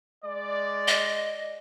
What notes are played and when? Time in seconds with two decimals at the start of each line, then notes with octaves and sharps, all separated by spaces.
0.25 G#3 D5
0.88 D#5